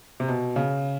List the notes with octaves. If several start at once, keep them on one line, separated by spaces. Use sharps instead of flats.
C3
B2
C#3